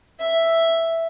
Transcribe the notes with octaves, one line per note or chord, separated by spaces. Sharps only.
E5